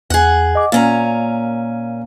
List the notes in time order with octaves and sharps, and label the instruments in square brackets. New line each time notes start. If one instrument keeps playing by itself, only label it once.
[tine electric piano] E2 F#6 [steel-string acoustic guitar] G#4 F#5
[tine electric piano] D#5 D6
[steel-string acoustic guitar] A#2 C#4 A#5 [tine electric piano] A#3 F5